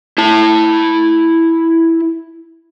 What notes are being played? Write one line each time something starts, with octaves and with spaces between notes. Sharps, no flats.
E4 A5